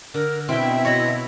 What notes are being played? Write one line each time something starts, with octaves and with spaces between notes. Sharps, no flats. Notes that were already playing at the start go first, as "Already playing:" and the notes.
D3 A#4
B2 C4 E4 E5 G5
C#5 D#5 B5